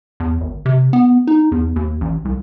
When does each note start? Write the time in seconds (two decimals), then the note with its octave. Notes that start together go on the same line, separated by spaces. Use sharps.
0.20 E2
0.41 G#1
0.66 C3
0.93 B3
1.27 D#4
1.52 E2
1.76 D#2
2.01 A1
2.25 C2